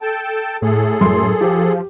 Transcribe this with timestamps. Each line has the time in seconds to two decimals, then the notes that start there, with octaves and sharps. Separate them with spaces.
0.02 A4 G5 A5
0.62 A2 G#4 A4
1.01 F#2 C6
1.41 F3 G4